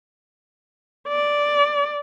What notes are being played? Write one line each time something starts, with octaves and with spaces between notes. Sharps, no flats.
D5